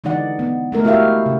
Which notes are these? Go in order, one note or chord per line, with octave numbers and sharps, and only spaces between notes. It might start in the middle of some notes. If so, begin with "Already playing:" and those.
D3 E3 G#3 D#4 D5 F#5
B3
G#3 A3 A#4
E4 F#4 G4 A#4 E5 F5
C#3